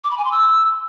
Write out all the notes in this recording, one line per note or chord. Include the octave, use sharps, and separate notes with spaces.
D6
B5
G#5
C6
E6